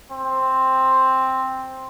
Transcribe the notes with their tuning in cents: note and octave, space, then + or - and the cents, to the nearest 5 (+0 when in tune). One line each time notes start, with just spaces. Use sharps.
C4 +5